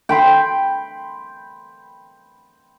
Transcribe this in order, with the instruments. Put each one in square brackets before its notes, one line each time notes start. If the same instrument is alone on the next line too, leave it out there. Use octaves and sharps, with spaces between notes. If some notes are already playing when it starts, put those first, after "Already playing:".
[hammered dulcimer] G5 B5 C6